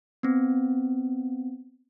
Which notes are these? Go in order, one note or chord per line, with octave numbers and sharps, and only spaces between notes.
B3 C4